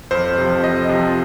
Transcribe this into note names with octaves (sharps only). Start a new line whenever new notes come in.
F2 C5
C3 F3
F2 D#5
C3 F3